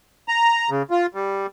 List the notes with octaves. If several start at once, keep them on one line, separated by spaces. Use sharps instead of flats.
A#5
C#3
F4
G3